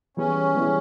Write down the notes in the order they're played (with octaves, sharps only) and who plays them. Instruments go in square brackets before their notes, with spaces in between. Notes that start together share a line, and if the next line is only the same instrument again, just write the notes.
[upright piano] E3 G3 B3 E4 G#4 [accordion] C#4
[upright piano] E3 G3 B3 E4 G#4